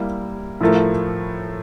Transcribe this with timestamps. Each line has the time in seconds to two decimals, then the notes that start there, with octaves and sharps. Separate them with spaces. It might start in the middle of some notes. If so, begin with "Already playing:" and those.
Already playing: G3 A#3 E4
0.61 A2 F3 A3 E4 A#4